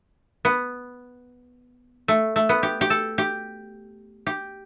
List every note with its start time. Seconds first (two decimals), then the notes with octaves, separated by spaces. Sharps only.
0.45 B3
2.08 A3
2.36 A3
2.49 B3
2.63 G4
2.81 G4
2.90 A4
3.18 G4
4.27 G4